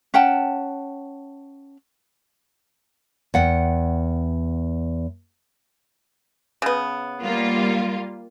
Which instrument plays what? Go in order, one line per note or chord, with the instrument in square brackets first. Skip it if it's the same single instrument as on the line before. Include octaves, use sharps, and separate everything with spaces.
[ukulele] C#4 F#5 G5 A5
[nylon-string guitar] E2 F#5 G5
[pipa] C#3 B3
[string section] G3 A#3 F4